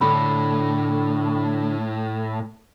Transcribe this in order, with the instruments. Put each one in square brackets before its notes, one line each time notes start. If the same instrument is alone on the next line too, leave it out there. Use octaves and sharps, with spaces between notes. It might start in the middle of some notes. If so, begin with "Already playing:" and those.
[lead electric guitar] A2 [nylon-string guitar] D3 [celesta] B5